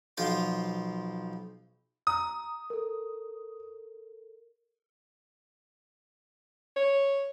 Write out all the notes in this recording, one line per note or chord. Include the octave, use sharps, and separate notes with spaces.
B1 F3 F4 F5 C6
A#5 D#6
A4 A#4
C#5